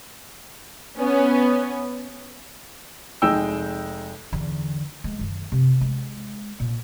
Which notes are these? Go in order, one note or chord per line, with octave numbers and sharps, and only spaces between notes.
B3 C#4
F1 G#3 D#4 G5 E6
E2 D3
G#3
F#2 D#3
C3
G#3
A#2